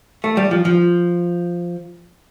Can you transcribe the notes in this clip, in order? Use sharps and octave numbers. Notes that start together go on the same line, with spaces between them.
A3
G3
F3
F3